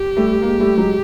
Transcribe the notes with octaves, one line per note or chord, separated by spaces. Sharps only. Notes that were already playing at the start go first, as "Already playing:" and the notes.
Already playing: G4
G3 A3
G#3 A#3
G3 A3
F#3 G#3